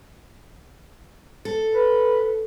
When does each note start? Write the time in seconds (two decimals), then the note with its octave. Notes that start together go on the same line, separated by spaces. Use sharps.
1.45 A4
1.74 B4